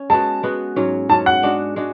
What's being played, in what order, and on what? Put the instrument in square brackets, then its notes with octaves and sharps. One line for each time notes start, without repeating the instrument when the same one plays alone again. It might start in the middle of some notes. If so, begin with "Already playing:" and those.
Already playing: [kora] C#4
[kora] G#3 B3 F#4 [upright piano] A5
[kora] G#3 B3 F#4
G#2 F#3 C#4
[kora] G#2 F#3 C#4 [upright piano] A5
[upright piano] F#5
[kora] G#3 D4 F#4
G#3 D4 F#4